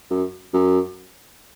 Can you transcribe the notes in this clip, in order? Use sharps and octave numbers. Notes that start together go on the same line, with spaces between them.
F#2
F#2